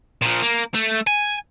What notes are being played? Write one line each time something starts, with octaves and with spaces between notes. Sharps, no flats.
A#2 F3
A#3
A3
G#5